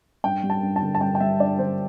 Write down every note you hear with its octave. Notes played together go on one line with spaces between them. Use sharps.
G2 G5
G3
A5
G2
A5
D3
A5
G2 G5
G5
G3 E5
G2 D5
D3 C5